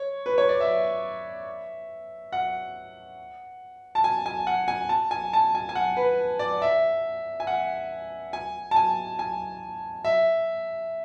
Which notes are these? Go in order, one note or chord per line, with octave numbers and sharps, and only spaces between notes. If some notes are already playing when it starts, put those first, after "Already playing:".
Already playing: C#5
B4
C#5
D5
E5
F#5
A5
G#5
G#5
F#5
G#5
A5
G#5
A5
G#5
G#5
F#5
B4
D5
E5
G#5
F#5
G#5
A5
G#5
G#5
E5